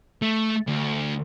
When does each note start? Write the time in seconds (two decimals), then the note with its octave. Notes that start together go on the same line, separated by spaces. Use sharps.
0.22 A3
0.68 D2